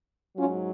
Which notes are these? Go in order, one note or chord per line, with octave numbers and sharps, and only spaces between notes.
G#2 F#3 C#4 F4